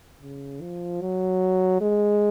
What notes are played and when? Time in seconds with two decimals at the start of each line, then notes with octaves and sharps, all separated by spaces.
0.21 C#3
0.61 F3
1.01 F#3
1.81 G#3